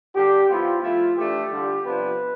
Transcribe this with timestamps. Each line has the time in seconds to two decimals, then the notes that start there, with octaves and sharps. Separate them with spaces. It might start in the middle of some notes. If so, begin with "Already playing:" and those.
0.15 D3 G3 D4 G4
0.49 G2 F3 B3 E4 F4
0.82 F3 A3 E4 F4
1.16 E3 A3 D4 G4
1.50 D3 G3 D4 F4
1.84 C3 F3 B3 D4 F4 B4